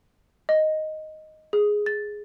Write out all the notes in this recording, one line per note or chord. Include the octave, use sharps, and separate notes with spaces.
D#5
G#4
A6